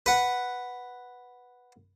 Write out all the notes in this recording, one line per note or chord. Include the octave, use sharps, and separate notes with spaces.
B4 F#5